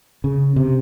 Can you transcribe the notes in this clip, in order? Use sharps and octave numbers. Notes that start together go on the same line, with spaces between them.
C#3
C3